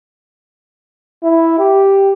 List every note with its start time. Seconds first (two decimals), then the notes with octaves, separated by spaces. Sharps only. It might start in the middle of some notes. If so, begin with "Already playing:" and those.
1.23 E4
1.59 G4